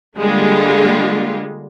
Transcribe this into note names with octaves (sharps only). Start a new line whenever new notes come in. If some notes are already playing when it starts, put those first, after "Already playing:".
D3 G3 G#3 A#3 F4